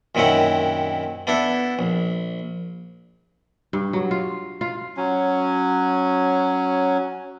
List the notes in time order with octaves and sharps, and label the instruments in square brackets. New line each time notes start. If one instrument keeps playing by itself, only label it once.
[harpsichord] F#2 A#2 D#3 C4 E4 F#5
B3 D4 E4 A4 E5
A#1
[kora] G2
F#3
F4
F4
[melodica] F#3 C#4